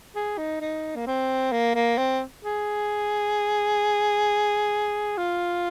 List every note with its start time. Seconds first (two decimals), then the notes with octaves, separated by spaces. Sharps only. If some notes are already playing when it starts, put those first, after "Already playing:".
0.15 G#4
0.38 D#4
0.61 D#4
0.96 A#3
1.07 C4
1.52 A#3
1.75 A#3
1.98 C4
2.44 G#4
5.17 F4